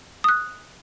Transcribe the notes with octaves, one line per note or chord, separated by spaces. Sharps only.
D#6 F#6